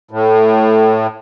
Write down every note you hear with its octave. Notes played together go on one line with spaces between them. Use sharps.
A2